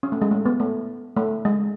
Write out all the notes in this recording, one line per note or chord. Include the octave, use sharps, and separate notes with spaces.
C#4
A3
G#3
A3
B3
A3
A3
G#3